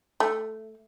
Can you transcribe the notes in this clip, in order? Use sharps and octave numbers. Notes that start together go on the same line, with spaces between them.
A3